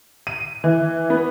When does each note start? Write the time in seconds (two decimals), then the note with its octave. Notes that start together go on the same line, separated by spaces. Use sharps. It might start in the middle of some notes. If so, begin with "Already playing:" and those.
0.27 D#7
0.64 E3
1.10 B3